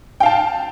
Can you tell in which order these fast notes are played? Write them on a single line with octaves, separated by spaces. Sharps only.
G5 F5 A5